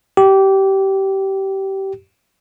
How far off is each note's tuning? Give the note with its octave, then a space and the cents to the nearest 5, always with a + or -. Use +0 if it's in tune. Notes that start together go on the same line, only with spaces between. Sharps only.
G4 -20